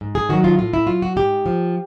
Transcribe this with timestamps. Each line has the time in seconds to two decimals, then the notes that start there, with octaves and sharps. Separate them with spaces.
0.01 G#2
0.15 G#4
0.29 D#3 F#3 F#4
0.44 F4
0.59 A2 F4
0.74 E4
0.87 F#3 F4
1.02 F#4
1.16 G#2 G4
1.46 F3